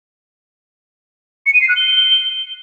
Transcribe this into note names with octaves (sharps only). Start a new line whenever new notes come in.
C#7
D#7
C7
F#6
G7